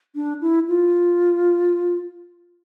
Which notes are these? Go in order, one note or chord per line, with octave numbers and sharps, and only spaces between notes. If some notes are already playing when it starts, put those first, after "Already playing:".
D4
E4
F4